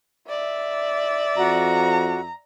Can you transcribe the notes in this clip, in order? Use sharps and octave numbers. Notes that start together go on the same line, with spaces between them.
D5 E5
F2 F#4 A#5